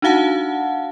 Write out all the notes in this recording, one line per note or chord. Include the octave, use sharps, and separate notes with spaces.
D4 D#4 F#4 F5 F#5 A5